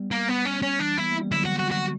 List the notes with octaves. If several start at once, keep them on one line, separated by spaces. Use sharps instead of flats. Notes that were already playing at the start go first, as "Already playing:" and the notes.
Already playing: G3 B3
A#3
B3
C#4
C#4
E3 G3 D4
B3 E4
A#3
G3
D3 F#3 E4
F#4
F#4
F#4